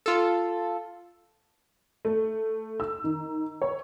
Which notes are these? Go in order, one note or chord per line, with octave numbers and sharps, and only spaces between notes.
F4 A4
A3
E6
D#3
C#5